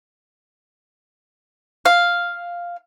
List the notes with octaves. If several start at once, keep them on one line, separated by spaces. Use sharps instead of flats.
F5